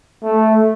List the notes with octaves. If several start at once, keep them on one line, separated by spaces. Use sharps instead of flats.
A3